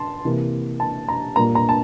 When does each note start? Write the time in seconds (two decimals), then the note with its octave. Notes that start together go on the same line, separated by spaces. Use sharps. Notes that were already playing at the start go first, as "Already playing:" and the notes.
Already playing: A5 C6
0.25 C3 E3 A#3
0.80 A5
1.08 A#5
1.36 A#2 G3 A#3 A#5
1.55 A#5
1.69 A5